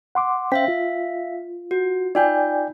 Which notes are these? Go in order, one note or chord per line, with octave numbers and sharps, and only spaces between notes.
F#5 C6 D6
C#4 C5 E5 F5 G5 B6
F4
F#4
D#4 F4 D5 G5 G#5 G6